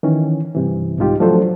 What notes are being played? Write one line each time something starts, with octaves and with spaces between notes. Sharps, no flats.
D#3 E3 C#4
G2 C3 E3
C2 G#2 D#4 F4 G4
F3 F#3 A3 D4 A4 C5